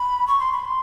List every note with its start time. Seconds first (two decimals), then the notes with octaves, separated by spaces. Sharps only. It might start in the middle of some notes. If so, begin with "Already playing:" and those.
Already playing: B5
0.27 C#6
0.39 C6
0.52 B5
0.65 C6